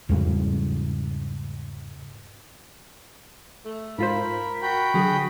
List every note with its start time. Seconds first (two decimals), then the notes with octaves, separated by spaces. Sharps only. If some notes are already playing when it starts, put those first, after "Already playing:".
0.09 E2 G#2 C#3 G3
3.65 A3
3.98 G#2 F4 A#4 C5 B5
4.62 F#4 G5 B5
4.94 D3 F#3 G#4